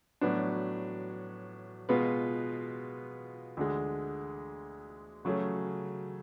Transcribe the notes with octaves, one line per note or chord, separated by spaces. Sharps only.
A2 F#3 B3 D4
B2 G#3 B3 F4 B4
D2 D3 G#3
C#3 F#3 A3 C#4 G#4